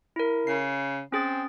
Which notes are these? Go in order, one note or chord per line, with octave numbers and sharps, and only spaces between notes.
E4 A#4
C#3 C7
C4 C#4 G#4 A6